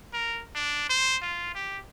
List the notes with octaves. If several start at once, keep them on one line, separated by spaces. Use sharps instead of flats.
A#4
D4
C5
F4
G4